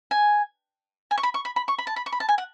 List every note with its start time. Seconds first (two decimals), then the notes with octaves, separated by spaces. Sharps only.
0.11 G#5
1.11 G#5
1.18 C#6
1.23 B5
1.34 C#6
1.45 B5
1.56 B5
1.68 C#6
1.78 B5
1.87 A5
1.96 B5
2.06 C#6
2.12 B5
2.20 A5
2.29 G#5
2.38 F#5